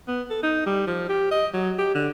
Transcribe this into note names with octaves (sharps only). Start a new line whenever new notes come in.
B3
A4
D#4
G3
F3
G4
D#5
F#3
G4
D3